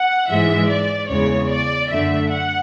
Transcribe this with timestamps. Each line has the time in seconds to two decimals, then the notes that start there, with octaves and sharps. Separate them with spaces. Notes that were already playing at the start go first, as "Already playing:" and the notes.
Already playing: F#5
0.29 G#2 E3 G#3 E5
0.69 D5
1.10 E2 C#3 G#3 C#5
1.50 D5
1.90 F#2 D3 A3 E5
2.30 F#5